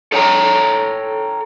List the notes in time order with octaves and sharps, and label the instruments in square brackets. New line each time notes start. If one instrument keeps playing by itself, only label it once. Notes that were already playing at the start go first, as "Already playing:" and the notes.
[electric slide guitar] A4 C#5 G5 A5 A#5